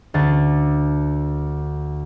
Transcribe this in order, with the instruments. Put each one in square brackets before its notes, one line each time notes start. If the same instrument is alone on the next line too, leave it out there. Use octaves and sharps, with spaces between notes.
[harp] D2 A5